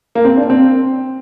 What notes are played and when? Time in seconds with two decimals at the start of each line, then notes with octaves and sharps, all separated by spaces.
0.15 A#3
0.25 C4
0.37 D4
0.50 C4